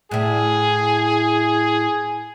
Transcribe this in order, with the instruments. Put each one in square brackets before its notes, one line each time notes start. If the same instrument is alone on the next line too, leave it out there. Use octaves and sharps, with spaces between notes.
[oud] A2 E4 [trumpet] G#4